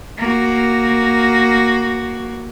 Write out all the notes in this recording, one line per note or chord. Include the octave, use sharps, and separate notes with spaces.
A#3 F#4